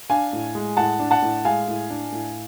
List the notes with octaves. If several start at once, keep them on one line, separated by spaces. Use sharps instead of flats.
D4 F5 G#5
A2
G#3
A2 F#5 A5
D4
F#5 A5
A2
G#3 F5 G#5
A2
D4
A2